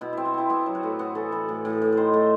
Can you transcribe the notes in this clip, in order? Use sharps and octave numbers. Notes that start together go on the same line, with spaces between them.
B2 E4
C4 E4
F#4
C4 E4
B3 E4
F#3
F#4
A2
B3 F#4
E3 A4
E3 B4
A2
A2
A2
D#3 B4 C5
A3